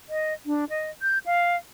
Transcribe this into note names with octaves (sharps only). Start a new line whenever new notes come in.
D#5
D4
D#5
G6
F5